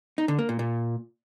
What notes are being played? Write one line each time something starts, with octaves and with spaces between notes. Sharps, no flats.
D#4
D3
A#3
A#2
A#2